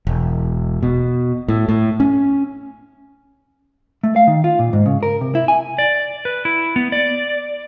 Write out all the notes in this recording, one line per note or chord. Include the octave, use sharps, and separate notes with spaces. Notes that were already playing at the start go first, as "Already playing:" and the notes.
E1
B2
A2
A2
C#4
A3
F5
D#3
F4
A#2
G#2
C#3
A#4
C3
E4
G#5
D5
B4
E4
B3
D5